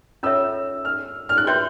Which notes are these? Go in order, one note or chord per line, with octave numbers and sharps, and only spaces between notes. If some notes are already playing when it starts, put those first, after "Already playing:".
C#4 F4 A4 C#5 E5 E6
F6
F6
F#6
F#4 B4 E5 G5 C6 G6